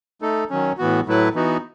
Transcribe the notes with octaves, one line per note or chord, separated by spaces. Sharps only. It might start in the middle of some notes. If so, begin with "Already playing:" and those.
A3 D#4 A4
D#3 F#3 C#4
A2 E3 B3 F#4
A2 F#3 A3 E4 B4
E3 B3 D#4 F#4